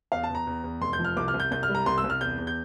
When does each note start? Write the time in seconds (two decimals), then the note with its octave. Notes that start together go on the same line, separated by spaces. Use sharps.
0.12 E2 F5
0.24 A5
0.29 E2
0.35 A#5
0.47 E2
0.64 E2
0.81 F1 C6
0.93 G6
0.99 F3
1.05 F6
1.17 C2 D6
1.28 F6
1.34 C2
1.40 G6
1.51 C2 G6
1.63 F6
1.69 G3
1.75 A#5
1.86 C2 C6
1.98 E6
2.04 C2
2.10 F6
2.21 E2 G6
2.38 E2
2.47 G6